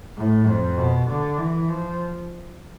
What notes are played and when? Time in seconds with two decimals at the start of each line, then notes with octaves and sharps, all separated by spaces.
0.16 A2
0.47 F2
0.77 B2
1.08 D3
1.38 E3
1.69 F3